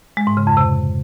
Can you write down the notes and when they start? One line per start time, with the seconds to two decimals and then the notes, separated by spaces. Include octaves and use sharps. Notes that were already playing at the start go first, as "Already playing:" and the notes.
0.17 G#3
0.27 G#2
0.37 C#3
0.47 F2
0.57 C3